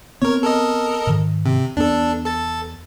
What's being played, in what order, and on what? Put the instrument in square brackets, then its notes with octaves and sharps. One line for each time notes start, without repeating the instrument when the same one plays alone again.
[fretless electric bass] B3 C4 [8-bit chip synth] A#4 C#5
[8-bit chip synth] A4 A#4 D#5
[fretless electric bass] G#2 D#3
[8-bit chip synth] C3
[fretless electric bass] E2 B3 [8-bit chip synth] D4 A4
[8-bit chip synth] A4 A6